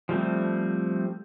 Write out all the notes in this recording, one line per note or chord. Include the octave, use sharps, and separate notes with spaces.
F3 G3 A3 C4